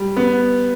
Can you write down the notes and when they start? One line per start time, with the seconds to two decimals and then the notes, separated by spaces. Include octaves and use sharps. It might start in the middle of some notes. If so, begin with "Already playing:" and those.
Already playing: G3
0.17 B3